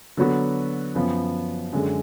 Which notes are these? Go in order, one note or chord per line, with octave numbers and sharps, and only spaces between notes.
D3 F#3 B3 F#4
F#2 F3 B3
F#2 D3 G#3